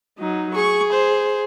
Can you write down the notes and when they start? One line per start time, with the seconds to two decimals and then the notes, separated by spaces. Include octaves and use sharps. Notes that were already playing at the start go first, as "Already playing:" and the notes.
0.18 F#3 D#4
0.55 G#4 C#6
0.93 C5